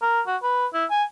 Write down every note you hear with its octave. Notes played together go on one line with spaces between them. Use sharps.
A#4
F#4
B4
E4
G#5